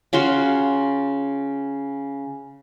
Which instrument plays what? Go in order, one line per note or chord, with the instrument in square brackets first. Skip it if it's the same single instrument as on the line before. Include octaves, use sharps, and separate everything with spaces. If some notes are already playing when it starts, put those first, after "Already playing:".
[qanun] C#3 F4 F#4 C6